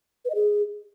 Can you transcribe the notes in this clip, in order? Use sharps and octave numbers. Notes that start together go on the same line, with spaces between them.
B4
D#5
G#4